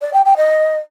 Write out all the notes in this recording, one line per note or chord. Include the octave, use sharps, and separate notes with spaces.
D5
G5
G5
D#5